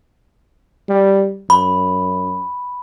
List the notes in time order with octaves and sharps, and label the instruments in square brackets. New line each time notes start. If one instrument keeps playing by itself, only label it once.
[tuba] G3
[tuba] F#2 [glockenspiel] B5